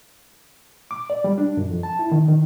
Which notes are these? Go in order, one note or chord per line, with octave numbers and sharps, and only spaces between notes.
D6
D5
G3
D4
F#2
F2
A5
E4
D#3
D#3